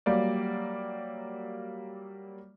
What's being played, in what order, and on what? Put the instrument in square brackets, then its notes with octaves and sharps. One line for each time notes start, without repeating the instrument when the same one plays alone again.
[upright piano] F#3 G3 A#3 D5